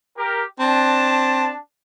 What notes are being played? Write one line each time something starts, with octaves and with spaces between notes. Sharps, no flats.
G4 A#4
C4 D4 A5